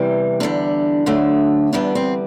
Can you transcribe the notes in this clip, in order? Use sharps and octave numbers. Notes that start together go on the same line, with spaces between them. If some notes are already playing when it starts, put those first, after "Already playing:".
Already playing: E2 C3 E3 G3
E2 D3 G3 D4
D2 D3 F#3 A3
E2 D3 G3 B3 D4
C4